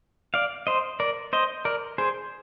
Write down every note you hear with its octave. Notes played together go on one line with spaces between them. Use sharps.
D5 F5
C5 D#5
A#4 D5
C5 D#5
A#4 D5
G#4 C5